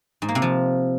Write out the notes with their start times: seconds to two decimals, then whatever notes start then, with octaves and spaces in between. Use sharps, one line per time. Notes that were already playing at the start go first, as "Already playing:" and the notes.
0.22 G#2
0.29 A#3
0.35 C3
0.42 F3